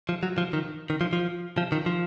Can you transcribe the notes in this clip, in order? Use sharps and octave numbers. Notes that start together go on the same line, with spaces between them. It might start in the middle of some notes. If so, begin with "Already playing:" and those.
F3
F#3
F3
D#3
D#3
F3
F3
F3
D#3
F3